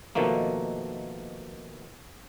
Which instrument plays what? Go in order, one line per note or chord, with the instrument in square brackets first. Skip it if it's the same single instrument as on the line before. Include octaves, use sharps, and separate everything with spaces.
[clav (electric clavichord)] B2 D#3 F3 A3 A#3